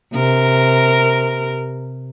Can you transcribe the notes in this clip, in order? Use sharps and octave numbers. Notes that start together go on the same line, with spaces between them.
C3 A#4